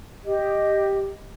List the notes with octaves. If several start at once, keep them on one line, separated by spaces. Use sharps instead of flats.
G4 D#5